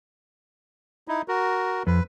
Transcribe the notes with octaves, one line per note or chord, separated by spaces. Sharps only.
D#4 E4
F#4 A#4
F2 B4